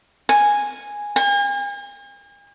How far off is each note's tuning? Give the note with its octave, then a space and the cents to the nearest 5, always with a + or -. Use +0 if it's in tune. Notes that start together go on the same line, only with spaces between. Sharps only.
G#5 -5
G#5 -45